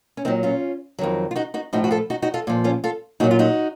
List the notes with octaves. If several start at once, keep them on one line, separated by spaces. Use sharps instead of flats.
C#4
A#2 F#3 C4 D#4
C#4 F4
F2 D#3 F#3
F4
D#4 F#4
D#4 F#4
A2 F3 D#4 F#4
F#4
F4 A4
D#4 F#4
D#4 F#4
F4 A4
A#2 F3
C#4 F4
F4 A4
A#2 F#3 D#4 F#4
F4
D#4 F#4